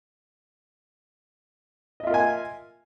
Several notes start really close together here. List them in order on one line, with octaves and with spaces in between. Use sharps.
D#5 E5 F4 A#4 G#5